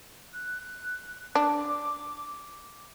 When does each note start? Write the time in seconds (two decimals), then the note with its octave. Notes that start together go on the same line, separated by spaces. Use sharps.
0.33 F#6
1.35 D4 D6